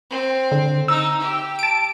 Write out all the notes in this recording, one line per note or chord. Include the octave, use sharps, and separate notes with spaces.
C4
D3
D#4 E6
G4
A5 D7